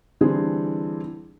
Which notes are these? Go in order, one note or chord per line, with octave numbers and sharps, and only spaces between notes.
D3 E3 G3 C4 D4 G#4